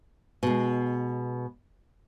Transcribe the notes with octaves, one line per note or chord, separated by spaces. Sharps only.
B2 G#3